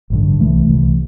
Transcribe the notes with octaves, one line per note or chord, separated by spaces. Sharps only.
A1 G2 D3
C2 C3 E3 A3
C2 C3 E3 A3